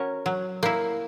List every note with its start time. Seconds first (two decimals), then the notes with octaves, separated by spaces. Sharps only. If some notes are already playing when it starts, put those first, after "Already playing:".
Already playing: C#4 F#4 A#4 C#5
0.26 F#3
0.63 A#3 E4